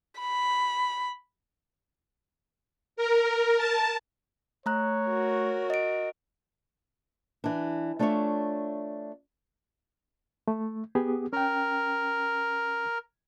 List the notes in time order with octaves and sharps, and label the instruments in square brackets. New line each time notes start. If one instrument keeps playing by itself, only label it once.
[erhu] B5
[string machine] A#4
A5
[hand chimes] A3 A#5 F#6 [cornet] C#5
[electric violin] F#4 A#4
[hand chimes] D#5 D7
[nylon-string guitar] E3 D4
A3 D4 F4 G#4 C#5 E5
[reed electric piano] A3
B3 G4 G#4
[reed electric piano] C#4 G5 [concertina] A#4